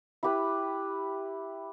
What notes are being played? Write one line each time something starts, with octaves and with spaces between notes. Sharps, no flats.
E4 G4 B4